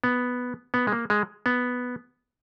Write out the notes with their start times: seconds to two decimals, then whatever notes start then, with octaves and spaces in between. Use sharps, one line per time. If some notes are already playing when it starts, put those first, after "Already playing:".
0.04 B3
0.74 B3
0.87 G#3
0.92 A#3
1.10 G#3
1.46 B3